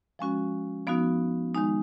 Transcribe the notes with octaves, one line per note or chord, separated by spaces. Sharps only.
F3 G#3 C#4 F#4
F3 B3 D#4 F#4
D#3 G#3 D#4